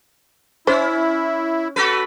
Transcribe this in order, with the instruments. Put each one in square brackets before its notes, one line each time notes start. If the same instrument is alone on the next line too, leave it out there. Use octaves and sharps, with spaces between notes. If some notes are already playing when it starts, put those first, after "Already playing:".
[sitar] C#4 [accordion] E4 [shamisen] C5
[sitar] F#4 A4 B4